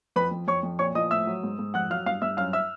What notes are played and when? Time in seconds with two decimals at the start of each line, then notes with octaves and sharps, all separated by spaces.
0.16 F2 B4 B5
0.31 F2
0.48 F2 C#5 C#6
0.63 F2
0.79 A#2 C#5 C#6
0.95 F3 D#5 D#6
1.11 A2 E5 E6
1.27 F#3
1.43 G#2
1.59 G#2
1.74 F2 F#5 F#6
1.90 F#3 F5 F6
2.06 G2 F5 F6
2.22 G2 E5 E6
2.37 F#2 F5 F6
2.53 E5 E6